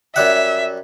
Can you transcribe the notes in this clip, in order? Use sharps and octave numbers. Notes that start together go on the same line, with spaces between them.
F#2 G3 E5 F#5